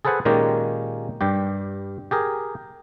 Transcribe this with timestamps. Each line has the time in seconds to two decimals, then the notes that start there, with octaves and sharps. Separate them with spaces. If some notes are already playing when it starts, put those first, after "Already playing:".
0.05 G#4 A4 B4 C5 F#5 G#5
0.25 A#2 D#3 G#3 A#3 C#4 G4
1.21 G2 G3 G4
2.11 G4 G#4 A#4